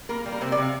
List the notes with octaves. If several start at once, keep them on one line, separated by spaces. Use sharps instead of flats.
A#3 A#4
G3
A#4
C3 C5
D5
C3
F5